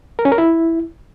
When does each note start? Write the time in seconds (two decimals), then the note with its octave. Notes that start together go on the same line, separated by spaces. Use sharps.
0.19 A#4
0.25 C#4
0.32 A#4
0.38 E4